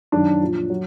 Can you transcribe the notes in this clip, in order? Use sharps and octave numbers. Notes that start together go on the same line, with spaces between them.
F#2 D#3 F#3 D4
A#2 F3
F#3